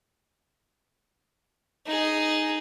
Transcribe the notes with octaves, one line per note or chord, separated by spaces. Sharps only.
D#4 G#4